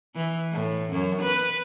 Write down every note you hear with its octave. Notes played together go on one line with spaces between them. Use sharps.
E3
A2
F#2
B4